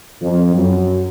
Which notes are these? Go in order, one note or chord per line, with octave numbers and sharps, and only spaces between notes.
F2
F#2